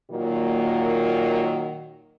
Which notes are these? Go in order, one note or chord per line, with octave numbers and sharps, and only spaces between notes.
A#2 D#3 F#3 A#3